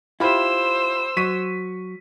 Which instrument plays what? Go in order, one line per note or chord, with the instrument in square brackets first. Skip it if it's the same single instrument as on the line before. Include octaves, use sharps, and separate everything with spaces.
[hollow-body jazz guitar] E4 [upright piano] F4 G4 B5 [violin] C5 E6
[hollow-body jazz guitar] F#3 [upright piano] C#6 B6 D#7